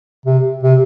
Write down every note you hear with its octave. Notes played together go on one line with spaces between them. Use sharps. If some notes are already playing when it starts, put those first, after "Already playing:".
C3
C3